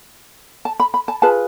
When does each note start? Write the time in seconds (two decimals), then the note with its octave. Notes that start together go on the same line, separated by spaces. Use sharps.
0.65 A5
0.80 B5
0.94 B5
1.08 A5
1.22 F4 G#4 B4 A5